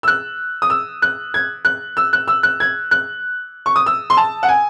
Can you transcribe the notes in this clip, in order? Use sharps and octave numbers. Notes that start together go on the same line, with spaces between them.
E6
F#6
D#6
E6
F#6
G#6
F#6
E6
F#6
E6
F#6
G#6
F#6
C#6
D#6
E6
C6
A5
F#5
G#5